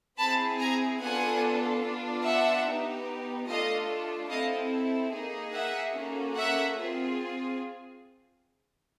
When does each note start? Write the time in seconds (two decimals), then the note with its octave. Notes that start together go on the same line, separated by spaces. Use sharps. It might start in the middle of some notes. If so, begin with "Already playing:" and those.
0.18 C4 E4 G#4 A5 B5
0.59 G#5 A#5
1.00 B3 D4 F4 A4 F#5 G#5
1.82 B3 D4 F4
2.23 E5 F#5
2.66 B3 D#4 G4
3.47 A3 D4 F4 A4 D#5 F5
4.30 C4 E4 A4 D#5 F5
5.12 A#3 D#4 G#4
5.53 E5 F#5
5.96 A#3 C#4 F#4 A4
6.36 E5 F#5
6.77 C4 F4 G#4